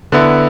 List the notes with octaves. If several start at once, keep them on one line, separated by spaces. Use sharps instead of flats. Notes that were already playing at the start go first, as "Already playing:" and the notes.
D3 B3 E4